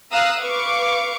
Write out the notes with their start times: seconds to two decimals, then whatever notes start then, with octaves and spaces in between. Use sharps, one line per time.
0.12 F5 A#5 D#6 E6 F#6
0.40 B4 F5 C#6 D6